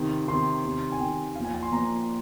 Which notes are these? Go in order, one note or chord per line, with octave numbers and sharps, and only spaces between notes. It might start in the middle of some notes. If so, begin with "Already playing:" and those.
Already playing: C3 D#3 C6
C3 D#3 C6
C3 D#3
G#5
C3 D#3 G5
A#2 F3 F5
G#5
G#5
C6
A#2 F3 A#5